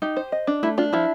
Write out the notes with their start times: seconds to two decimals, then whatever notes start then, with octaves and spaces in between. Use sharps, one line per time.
0.02 D#4 G4
0.17 C5
0.32 D#5
0.47 D4
0.63 A3 E4
0.78 D4 F4
0.93 F3 E4